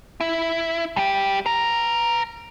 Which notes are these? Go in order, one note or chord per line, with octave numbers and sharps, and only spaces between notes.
E4
G3 G4
B4 A#5